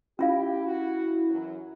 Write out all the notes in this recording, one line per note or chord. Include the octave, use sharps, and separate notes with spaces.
C#4 E4 F4 G4 F5
F#4
F#2 E3 F#3